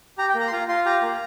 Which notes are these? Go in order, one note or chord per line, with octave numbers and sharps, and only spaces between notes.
G4 A#5
G5
A#3
A#5
C6
F4 A#5
F4 C6
G4 A#5
A#3